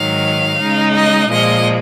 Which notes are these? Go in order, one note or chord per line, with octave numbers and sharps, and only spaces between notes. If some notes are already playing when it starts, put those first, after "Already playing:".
Already playing: G#2 D#3 F#3 F5
C#3 G#3 D#4
D#5
A#2 F3 G#3 D#5